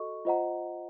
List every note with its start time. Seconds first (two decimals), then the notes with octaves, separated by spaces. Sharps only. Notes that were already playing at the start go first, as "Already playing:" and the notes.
Already playing: F#4 A4 D#5 C#6
0.25 F4 C5 D#5 F#5 A#5